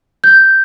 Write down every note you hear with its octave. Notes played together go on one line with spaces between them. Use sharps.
G6